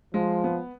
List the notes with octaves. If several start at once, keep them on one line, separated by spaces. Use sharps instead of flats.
F3 G#3
B3